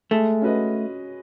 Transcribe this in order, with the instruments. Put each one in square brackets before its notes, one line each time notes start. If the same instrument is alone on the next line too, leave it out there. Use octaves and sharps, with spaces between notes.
[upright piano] G#3 [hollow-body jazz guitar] A3
[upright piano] C#4 F#4 B4 D#5